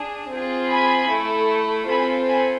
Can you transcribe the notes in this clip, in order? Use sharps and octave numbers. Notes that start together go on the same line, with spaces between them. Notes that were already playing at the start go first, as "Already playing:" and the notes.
Already playing: D4 G#4
C4 F4 G#4
G#5 B5
A3 E4 A4
C4 F4 A4 G#5 B5
G#5 B5